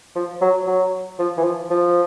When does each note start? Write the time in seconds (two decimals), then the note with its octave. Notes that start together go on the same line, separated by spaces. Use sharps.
0.16 F3
0.41 F#3
0.67 F#3
1.19 F3
1.38 E3
1.44 F3
1.70 F3